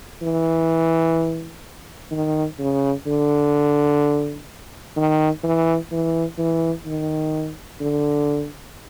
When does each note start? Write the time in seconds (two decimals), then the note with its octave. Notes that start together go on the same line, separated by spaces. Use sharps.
0.22 E3
2.11 D#3
2.59 C#3
3.06 D3
4.97 D#3
5.44 E3
5.91 E3
6.38 E3
6.86 D#3
7.80 D3